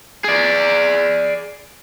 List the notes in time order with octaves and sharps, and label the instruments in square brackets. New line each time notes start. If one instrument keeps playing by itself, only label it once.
[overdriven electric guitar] G#4 D5